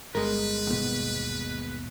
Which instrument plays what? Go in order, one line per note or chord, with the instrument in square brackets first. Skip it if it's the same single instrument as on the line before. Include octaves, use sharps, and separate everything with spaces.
[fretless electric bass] G1 [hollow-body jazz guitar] G#3 A#4 [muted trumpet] B4
[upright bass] D#2 B2